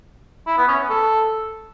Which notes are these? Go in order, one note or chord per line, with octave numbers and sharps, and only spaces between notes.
E4
B3
C#4
B3
A4